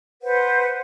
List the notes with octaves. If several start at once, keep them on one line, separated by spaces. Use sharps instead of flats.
B4 C5 F#5